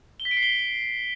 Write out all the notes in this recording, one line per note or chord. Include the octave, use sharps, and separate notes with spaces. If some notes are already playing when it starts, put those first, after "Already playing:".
G7
B6
D7
C7
G7